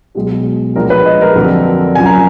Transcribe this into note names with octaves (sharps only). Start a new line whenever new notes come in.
B1 B2 G#3
A#1 A#2 G#3 A#4
B4
D#5
A#4
F2 D3 F#3
F#1 F#2 F3 G#5
A#5